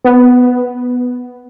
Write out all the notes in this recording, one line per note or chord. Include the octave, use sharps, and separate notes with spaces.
B3